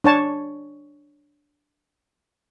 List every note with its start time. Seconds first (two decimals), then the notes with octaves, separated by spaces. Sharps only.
0.04 D4 C#5 A5